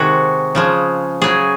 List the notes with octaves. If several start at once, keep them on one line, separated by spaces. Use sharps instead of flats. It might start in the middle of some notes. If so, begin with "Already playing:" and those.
Already playing: C3 D#3 G#3 F#4
C#3 F3 G#3
C#3 F#3 G#4